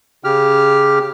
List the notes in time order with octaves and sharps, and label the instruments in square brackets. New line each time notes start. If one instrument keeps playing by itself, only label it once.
[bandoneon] C#3 G4 F6